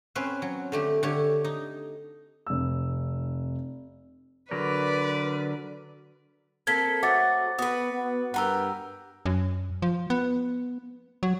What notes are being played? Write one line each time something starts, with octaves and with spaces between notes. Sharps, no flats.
C4 C#4 B4 C5
F#3
D3 A3 G4
D3 G4 C#5
D#4
F1 E6
D3 F#3 A#4 B4 D5
A#3 C4 A4 G#6 B6
F#3 A3 F#4 C5 D6 A6
B3 F#4 B4 D#6
B3
G2 B3 G4 A#4 F#5 A#5 E6
F#2
F3
B3
F#3